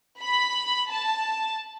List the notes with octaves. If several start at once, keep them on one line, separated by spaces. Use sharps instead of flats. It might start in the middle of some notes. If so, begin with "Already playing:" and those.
B5
A5